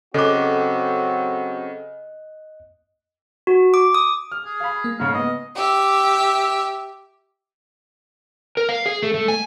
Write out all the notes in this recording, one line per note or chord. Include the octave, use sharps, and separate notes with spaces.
C#3 F#3 C4 F#4 A4 D#5 D6 F#6
F#4
D6
D#6
F6
G#4
F5 B5
A#3
G#2 C#3 F5
B3 D#5
G4 E5
A#4
F5
G#4
A3
A3
G#5